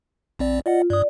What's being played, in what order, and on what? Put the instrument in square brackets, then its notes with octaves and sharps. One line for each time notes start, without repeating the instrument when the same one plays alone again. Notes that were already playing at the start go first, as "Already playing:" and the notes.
[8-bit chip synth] A#1 C4 D5
[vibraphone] F4 [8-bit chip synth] D5 D#5 F#5
[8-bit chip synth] G2 D#6 [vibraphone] D5